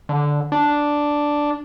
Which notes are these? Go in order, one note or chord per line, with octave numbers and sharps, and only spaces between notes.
D3
D4